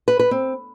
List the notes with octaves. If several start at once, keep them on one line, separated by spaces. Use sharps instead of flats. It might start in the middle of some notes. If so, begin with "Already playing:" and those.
B4
B4
C4